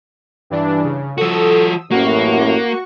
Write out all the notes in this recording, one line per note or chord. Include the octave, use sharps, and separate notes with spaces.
G2 E3 D4
C#3
F3 F#4 A4 D#6 E6
A1 F#2 A2 A#3 F#4 C#6